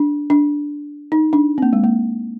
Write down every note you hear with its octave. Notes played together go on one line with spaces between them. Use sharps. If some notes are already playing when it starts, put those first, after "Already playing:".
Already playing: D4
D4
D#4
D4
C4
A#3
G#3
A#3